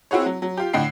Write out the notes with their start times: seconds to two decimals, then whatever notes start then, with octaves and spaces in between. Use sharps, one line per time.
0.11 C4 E4 F#4 G#4 C#5
0.26 F#3
0.42 F#3
0.57 F4 G4
0.73 A2 D3 D#5 G5 C7